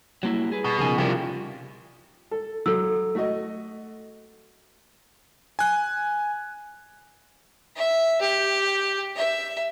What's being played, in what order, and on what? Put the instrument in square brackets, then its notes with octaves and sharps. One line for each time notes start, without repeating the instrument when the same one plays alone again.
[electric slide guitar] F#3 A#3 E4 [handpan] G3
[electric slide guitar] G#4 B4
[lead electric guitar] B2
[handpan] C#3 F3 D#4 [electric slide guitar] G#4 A#4 G#5
[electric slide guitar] C3 E4 D5 [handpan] F3 G3 A#4 [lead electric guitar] F4 G4
[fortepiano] A4
[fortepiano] F#3 [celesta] A4 E6
[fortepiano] A3 F#4 D#5
[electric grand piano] G#5 F#6
[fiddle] E5
G4
E5